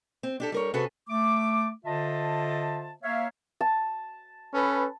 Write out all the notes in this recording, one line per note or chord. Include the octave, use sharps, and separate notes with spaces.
C4
D4 G4 A4
G3 A#4 C#5
C3 C#4 F#4 G#4 A4 B4
A3 D6
D3 F4 C5 D#5 E5 A5
A#3 C#5 E5 F5
A5
C#4 A4 B4